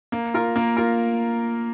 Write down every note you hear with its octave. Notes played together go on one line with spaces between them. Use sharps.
A#3
F4 A#4
A#3
F4 A#4